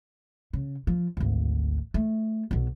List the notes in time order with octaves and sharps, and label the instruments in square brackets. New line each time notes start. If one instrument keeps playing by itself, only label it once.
[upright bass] C#3
F3
G#1 D2
A3
B1 B2